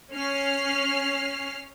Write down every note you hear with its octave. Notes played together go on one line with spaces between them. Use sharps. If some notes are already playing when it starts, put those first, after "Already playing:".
C#4 F6 C7